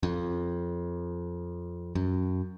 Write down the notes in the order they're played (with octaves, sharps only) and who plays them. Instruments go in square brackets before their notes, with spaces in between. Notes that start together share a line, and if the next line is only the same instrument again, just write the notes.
[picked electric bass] F2
F#2